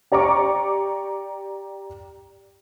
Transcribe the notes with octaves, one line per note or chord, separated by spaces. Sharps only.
G4 D5 A#5 C#6 D6